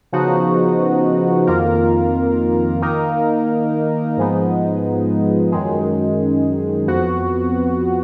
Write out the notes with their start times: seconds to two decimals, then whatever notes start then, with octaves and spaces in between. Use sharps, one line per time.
0.12 C#3 F3 B3 D#4 F#4
1.47 F2 D#3 A#3 F4 A#4
2.82 D#3 A#3 D#4 A#4
4.17 G#2 F3 G#3 B3 D#4
5.52 F#2 D#3 G#3
6.87 F2 F3 B3 F#4